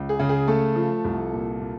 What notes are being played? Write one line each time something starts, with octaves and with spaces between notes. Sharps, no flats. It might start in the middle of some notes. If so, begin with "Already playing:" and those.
Already playing: C#2
G#4
C#3
G#4
A3 A4
F3
C2
A#2
A#2